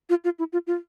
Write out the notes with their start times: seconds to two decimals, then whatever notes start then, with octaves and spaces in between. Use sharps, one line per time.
0.09 F4
0.24 F4
0.39 E4
0.53 F4
0.67 F4